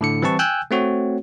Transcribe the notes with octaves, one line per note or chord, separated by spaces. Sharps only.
A2 D3 C#7
E3 G3 C4 E4 A5 C#6
G5 G#5 E6 F#6 G6
A3 C4 F#4 C#5